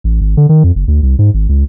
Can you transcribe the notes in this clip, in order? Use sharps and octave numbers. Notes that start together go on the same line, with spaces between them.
A1
G#1
D3
D#3
F2
F#1
D2
C2
G#2
G#1
C#2